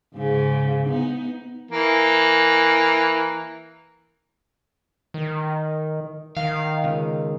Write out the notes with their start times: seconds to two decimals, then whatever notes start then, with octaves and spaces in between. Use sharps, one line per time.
0.15 G#2 C#3
0.86 B3 D#4
1.71 E3 A#3
5.14 D#3
6.37 D#3 F5
6.84 C#2